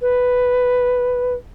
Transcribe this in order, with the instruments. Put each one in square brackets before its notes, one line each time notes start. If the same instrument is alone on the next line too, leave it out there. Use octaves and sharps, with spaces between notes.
[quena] B4